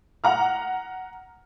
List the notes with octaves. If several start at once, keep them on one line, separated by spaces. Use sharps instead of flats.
F#5 A#5 F6